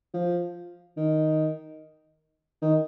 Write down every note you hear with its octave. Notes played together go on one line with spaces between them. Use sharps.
F3
D#3
D#3